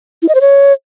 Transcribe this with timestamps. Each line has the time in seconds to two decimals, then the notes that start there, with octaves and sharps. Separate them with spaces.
0.22 E4
0.29 D#5
0.35 C5
0.41 C#5